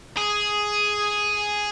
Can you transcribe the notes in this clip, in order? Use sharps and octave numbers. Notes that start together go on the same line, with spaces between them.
G#4